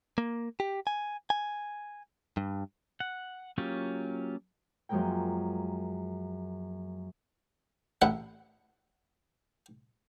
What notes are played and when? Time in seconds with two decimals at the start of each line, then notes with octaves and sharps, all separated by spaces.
0.18 A#3
0.60 G4
0.87 G#5
1.30 G#5
2.37 G2
3.00 F#5
3.58 F#3 A#3 C#4 F4 G4
4.89 F#2 F3 G#3 A#3 A#4 G5
8.02 A1 E4 F#5